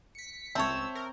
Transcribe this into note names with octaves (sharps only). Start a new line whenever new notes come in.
B6 C#7
C#2 C4 C#5 E5 A5 C#6 E6
A#4